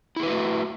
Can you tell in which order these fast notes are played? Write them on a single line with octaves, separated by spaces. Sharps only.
E4 G#4 B4 F#4 A3